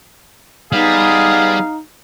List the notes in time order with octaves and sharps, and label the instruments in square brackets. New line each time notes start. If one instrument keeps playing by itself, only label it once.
[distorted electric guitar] G3 [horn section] B3 G#4 [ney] D#4 [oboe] F5